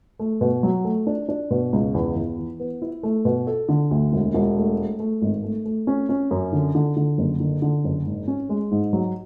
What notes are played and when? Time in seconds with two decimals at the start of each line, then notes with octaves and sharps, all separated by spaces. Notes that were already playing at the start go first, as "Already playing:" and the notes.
0.19 A3
0.41 B2
0.63 F#3
0.85 A3
1.07 D4
1.29 D4
1.51 B2
1.73 C#2
1.94 E2
2.16 E2
2.38 E3
2.60 B3
2.82 E4
3.03 A3
3.25 B2
3.47 A4
3.69 D3
3.91 D2
4.13 E1
4.34 E1
4.57 A3
4.78 A3
5.00 A3
5.22 G#1
5.43 A3
5.65 A3
5.87 C#4
6.09 C#4
6.31 F#2
6.53 D3
6.75 D3
6.97 D3
7.18 F#1
7.40 D3
7.62 D3
7.84 F#1
8.06 G#2
8.28 C#4
8.49 G#3
8.71 G#2
8.93 F#3